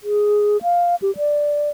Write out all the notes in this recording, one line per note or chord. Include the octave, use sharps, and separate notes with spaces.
G#4
F5
G4
D5